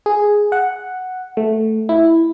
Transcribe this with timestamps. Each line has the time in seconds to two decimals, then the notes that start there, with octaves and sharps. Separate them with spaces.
0.06 G#4
0.52 F#5
1.37 A3
1.89 E4